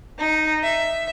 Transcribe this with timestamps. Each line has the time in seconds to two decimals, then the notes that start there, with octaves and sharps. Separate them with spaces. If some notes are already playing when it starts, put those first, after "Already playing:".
0.18 D#4
0.63 E5